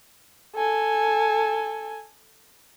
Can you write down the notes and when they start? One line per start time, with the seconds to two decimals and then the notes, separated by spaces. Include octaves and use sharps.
0.55 A4 G#5